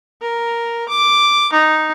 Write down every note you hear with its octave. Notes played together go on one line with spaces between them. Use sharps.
A#4
D6
D#4